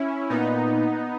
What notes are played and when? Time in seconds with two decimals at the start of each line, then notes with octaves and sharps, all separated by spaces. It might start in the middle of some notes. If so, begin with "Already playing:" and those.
Already playing: C#4 E4
0.29 A#2 B3 D#4